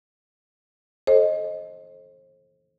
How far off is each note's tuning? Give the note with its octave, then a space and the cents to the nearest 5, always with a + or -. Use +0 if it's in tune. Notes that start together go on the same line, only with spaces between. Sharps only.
A4 -20 C5 +35 D#5 +5